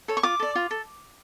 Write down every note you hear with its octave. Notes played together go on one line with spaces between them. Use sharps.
A4 C#5
C#6
F4 D6
A4 D5
F4
A4